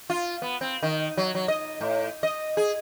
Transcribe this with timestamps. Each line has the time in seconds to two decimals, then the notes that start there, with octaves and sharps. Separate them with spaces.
0.10 F4
0.42 B3
0.61 C4
0.83 D#3
1.17 F#3
1.35 F#3
1.48 D#5
1.81 A2
2.23 D#5
2.57 G#4